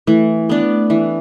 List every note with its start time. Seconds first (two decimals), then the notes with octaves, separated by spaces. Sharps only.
0.07 E3 A3
0.49 B3 D4
0.90 E3